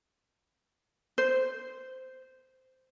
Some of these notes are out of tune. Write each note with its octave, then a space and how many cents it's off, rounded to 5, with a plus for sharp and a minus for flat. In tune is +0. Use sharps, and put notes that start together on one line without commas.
C5 -10